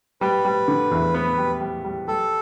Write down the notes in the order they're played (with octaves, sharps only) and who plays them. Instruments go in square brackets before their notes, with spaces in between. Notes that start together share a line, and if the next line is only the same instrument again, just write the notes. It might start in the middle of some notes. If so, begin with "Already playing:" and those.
[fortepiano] G3 [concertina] B4
[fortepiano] G3
D3
E2
B3
G3
G3
G3
[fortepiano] G3 [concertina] A4